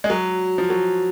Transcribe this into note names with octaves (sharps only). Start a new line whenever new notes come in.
G#3
F#3
F3
F#3